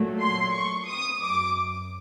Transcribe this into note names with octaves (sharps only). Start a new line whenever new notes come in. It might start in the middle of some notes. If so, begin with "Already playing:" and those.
Already playing: A#2 F#3 A3
C6
C#6
D#6
F#2 D6